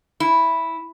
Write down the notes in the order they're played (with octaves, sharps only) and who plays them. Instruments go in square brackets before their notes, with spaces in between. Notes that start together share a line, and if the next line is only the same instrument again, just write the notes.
[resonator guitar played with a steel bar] E4